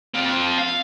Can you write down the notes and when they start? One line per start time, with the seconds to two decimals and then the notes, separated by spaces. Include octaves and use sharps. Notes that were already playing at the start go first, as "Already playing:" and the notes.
0.15 C4 F4
0.58 F5